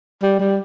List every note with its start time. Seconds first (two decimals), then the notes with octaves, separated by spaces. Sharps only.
0.23 G3
0.40 G3